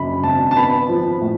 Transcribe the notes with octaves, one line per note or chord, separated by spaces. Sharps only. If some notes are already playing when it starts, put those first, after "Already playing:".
Already playing: F#2 C#3 B5
G#1 A5
A5
B3 B5
F3
A2